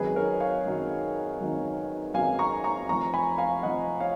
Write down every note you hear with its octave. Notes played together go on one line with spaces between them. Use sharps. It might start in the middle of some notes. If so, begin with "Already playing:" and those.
Already playing: G#1 F#2 D#3 F#3 G#4 B4
A#4 C#5
C#5 F5
G#1 F#2 D#3 F#3
G#1 F#2 D#3 F#3
G#1 F#2 D#3 F#3 F5 G#5
A#5 C#6
A#5 C#6
F1 F2 F3 A#5 C#6
G#5 B5
F5 G#5
F1 F2 F3 D#5 F#5
C#5 F5